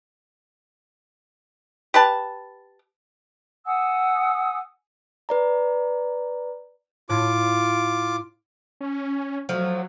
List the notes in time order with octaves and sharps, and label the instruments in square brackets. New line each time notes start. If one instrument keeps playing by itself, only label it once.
[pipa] G4 B4 A5
[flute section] F#5 G#5 D#6 E6
[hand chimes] B4 D5 A#5
[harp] A2 [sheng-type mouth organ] F4 D6
[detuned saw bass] C#4
[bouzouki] F3 A3 [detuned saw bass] F#3